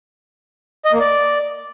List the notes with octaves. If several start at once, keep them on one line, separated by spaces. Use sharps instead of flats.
D#5
A#3
D5